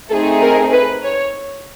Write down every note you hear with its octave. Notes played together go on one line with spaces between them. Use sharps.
A3 C4 D#4 G#4 A4
A#4
B4
C#5